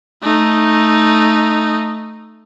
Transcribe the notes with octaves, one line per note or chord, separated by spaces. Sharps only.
A3 D#4